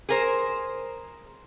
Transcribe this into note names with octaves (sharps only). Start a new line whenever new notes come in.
G#4 A#4 C5